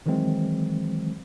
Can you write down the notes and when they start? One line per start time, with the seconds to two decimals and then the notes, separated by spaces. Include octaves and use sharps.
0.06 D#3 E3 F#3 G#3 C4